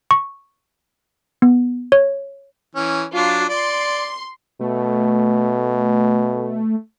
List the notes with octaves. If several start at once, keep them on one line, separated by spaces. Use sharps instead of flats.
C#6
B3
C#5
E3 C#4
F#3 D4 F4 C7
D5 C6
B2 A3